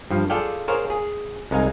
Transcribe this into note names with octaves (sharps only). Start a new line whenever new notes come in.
G2 F3
F4 G#4 A4 D5 F5 G5
G#4 A#4 C5 C#5 F5
G#4
C2 G#3 D#4 F5 G#5